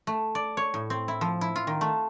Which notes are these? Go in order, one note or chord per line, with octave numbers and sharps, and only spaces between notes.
A3
D5
C#5
A2
C4
E4
F3
E4
F4
D#3
A3